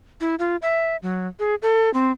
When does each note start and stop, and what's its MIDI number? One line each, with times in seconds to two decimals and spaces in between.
0.21 0.35 64
0.39 0.56 65
0.62 0.96 76
1.02 1.27 54
1.39 1.55 68
1.62 1.92 69
1.94 2.12 60